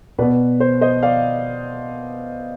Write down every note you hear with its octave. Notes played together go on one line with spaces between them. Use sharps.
B2 B3 B4 D5
C5
C5 D#5
D5 F5